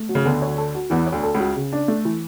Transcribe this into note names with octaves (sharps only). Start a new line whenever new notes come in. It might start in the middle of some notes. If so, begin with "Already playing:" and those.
Already playing: A3
F#3
C#3
D2 D3 B3
C#5
A4
F#4
E2 E3 B3
C#5
D2 D3
A4
C#2 C#3 F#4
C#3
D4
A3
E3